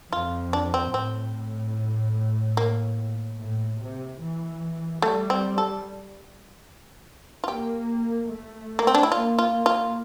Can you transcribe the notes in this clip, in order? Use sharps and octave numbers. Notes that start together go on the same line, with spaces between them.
F2 F4
D4
C4
A2 C4
A#3
A2
C3
E3
G3 A3
C4
A4
F4
A#3 G4
A3
A#3
C4
D4
E4
A#3 F4
F4
A#3
F4